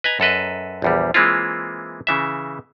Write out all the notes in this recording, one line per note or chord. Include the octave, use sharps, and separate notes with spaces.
B4 D#5 G#5 A#5
F#2 A4 B4 D#5
A#1 E2 G3
E3 G#3 A#3 C4 E4 F4
C#3 E3 E5